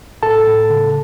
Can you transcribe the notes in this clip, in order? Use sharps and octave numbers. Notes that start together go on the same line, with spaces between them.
A2 A4 A5
A2
C#3